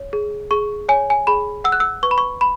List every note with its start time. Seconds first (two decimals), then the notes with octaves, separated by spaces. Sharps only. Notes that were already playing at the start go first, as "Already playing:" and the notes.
Already playing: C#5
0.13 G#4
0.51 G#4 C#6
0.89 C#5 G#5
1.10 G#5
1.27 G#4 B5
1.64 F#5 E6
1.72 F#6
1.80 E6
2.03 B4 C#6
2.11 B5
2.18 C#6
2.41 B5